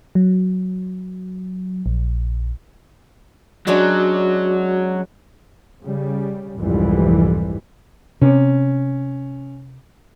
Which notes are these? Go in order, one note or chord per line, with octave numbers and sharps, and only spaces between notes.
F#3
A#1
F#3 G#3 C#4 D4 F#4
C#3 G3
F1 C2 F2 G#2 E3 G3
C3 C#4